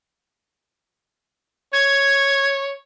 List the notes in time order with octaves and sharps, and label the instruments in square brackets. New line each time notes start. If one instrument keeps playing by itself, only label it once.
[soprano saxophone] C#5 [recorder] G#6